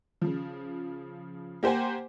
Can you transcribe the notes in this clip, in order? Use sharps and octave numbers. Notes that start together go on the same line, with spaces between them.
C#3 F3
A#3 G4 C5 F#5 G#5